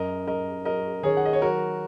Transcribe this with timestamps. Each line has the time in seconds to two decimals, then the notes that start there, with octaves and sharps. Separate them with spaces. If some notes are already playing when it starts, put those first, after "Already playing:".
Already playing: F#2 A#4 D#5
0.27 F#2 A#4 D#5
0.65 F#3 A#4 D#5
1.03 D#3 G#4 C#5
1.17 F#5
1.25 D#5
1.33 C#5
1.42 F#3 F#4 A#4